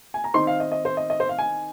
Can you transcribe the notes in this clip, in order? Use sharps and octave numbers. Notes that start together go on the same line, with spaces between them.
G#5
A#5
D#3 C4 D#4 C6
F5
D#5
D#5
C5
D#5
D#5
C5
F5
G#5